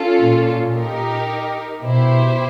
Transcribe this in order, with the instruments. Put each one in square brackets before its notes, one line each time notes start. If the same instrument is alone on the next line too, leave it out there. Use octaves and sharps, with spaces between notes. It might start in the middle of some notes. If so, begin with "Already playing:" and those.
Already playing: [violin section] C#4 F4 A4
[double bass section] A#2
[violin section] D#4 G4 A#4
[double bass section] B2 [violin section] E4 G4 C5